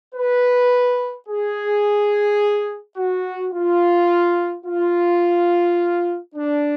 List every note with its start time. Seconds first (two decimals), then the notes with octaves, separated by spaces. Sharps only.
0.15 B4
1.28 G#4
2.97 F#4
3.54 F4
4.66 F4
6.35 D4